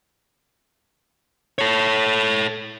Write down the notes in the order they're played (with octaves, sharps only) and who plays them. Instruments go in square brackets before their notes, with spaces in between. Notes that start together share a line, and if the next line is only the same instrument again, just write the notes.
[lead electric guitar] A4 C#5